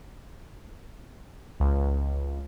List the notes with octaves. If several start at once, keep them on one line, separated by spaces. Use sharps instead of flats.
C#2